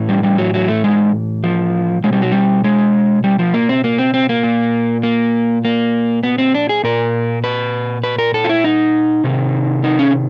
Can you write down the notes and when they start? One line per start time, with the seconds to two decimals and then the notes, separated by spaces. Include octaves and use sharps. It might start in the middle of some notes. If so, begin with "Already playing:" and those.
Already playing: A2 E3
0.09 G3
0.23 G3
0.38 F#3
0.54 F#3
0.68 A3
0.84 G#3
1.44 F3
2.04 B2 G#3
2.13 G3
2.22 F#3
2.32 G3
2.64 G#3
3.24 G3
3.39 F3
3.54 A#3
3.69 C4
3.84 A#3
3.98 C4
4.14 C4
4.29 A#3
4.43 A#2
5.03 A#3
5.65 A#3
6.23 B3
6.38 C4
6.54 D4
6.69 G#4
6.84 A#2 A#4
7.44 B4
8.03 B4
8.19 A#4
8.34 A4
8.44 F4
8.49 E4
8.64 D#4
9.24 C3 D#3
9.84 D#4
9.99 C#4